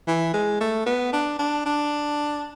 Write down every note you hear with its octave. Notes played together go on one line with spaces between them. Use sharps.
E3
G#3
A3
B3
D4
D4
D4